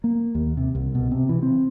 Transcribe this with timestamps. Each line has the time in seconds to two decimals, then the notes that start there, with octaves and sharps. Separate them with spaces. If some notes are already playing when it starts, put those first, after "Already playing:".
0.04 A#3
0.35 D#2
0.57 C3
0.75 C2
0.95 B2
1.11 C3
1.29 E3
1.43 C4